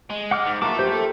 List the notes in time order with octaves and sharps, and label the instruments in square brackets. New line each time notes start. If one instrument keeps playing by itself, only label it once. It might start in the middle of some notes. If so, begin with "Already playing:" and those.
[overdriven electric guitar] G#3
[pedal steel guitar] F#5 D6 F6
[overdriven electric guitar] G#2
[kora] A#3 F4 [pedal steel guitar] F#4 D6 [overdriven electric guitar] E5 A5
[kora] G4 [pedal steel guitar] C5
[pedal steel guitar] A4